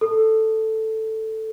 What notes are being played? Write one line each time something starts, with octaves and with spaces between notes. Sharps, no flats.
A4